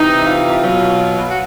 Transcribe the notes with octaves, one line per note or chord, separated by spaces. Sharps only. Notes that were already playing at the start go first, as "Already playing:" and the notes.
Already playing: C3 E3 D#4
F4
B2 F#3
F#4